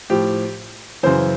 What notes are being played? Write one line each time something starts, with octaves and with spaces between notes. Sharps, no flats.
A2 F3 G4
F#2 C#3 E3 C5